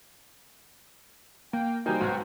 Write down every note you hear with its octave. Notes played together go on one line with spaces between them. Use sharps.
A#3 G5
G3 A#3 D#4 C5 G5 G#5
B1 G#2 F#4 F6